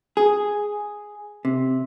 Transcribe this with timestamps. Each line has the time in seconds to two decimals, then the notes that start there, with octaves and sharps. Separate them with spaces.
0.17 G#4
1.45 C3